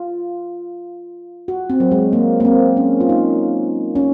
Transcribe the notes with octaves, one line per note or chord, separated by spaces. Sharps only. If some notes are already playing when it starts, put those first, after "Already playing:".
Already playing: F4
F#4
C4
F#3
G#3
A#3
A#3
C4
C#4
F4
D#4
C#4